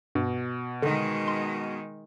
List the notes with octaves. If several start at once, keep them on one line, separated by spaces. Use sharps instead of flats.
G2 B2
D3 D#3 G#3
C6